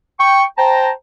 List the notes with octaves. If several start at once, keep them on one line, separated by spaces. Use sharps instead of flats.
G5 C#6
C5 G5 A5 A#5